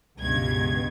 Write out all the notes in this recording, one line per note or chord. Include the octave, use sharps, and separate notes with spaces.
C#2 G2 B2 G#6